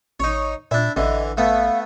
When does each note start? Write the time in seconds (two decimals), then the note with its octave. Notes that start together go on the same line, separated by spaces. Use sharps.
0.20 A1 D#4 C#5
0.71 A#2 D4 E4
0.96 A1 D3 E3 D#5
1.37 A3 B3 F5